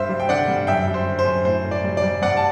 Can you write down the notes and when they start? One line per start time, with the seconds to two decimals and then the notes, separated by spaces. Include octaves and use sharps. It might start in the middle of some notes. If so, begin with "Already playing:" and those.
Already playing: G2 C5 E5
0.09 G3
0.20 G5
0.29 D3 D5 F#5
0.48 G2
0.67 F#2 E5 G5
0.87 G3
0.94 C5
1.06 D3
1.19 C5
1.25 F#2
1.45 A2 C5
1.65 A2
1.71 D5
1.84 G3
1.97 D5
2.04 G3
2.22 G2 D5 F#5
2.37 A5